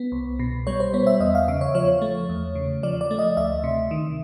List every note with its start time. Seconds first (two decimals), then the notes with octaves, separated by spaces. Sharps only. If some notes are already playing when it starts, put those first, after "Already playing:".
Already playing: B3
0.12 C2
0.39 B2
0.67 G3 C#5
0.80 C5
0.94 B3 C#5
1.07 E5
1.20 E2 D#5
1.35 F5
1.48 C#3 E5
1.61 C#5
1.75 F3 C#5
2.02 A3
2.29 E2
2.55 C#3
2.83 F3 D5
3.01 D5
3.11 A3
3.19 D#5
3.37 D2 E5
3.64 C3
3.91 D#3